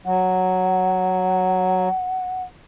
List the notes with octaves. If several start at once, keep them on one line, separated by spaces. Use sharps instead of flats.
F#3 F#5